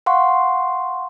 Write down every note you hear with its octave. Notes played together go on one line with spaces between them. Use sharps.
F5 F#5 C6 C#6